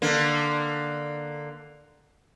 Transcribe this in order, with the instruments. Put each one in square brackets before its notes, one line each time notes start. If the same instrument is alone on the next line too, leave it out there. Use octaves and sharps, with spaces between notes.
[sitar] D3 A#3